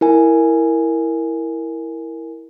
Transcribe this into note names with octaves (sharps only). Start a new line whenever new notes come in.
E4 A#4 G#5